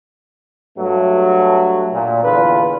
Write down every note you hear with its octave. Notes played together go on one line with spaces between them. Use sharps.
G2 F#3 A3
A#2
E2 D3 F4 B4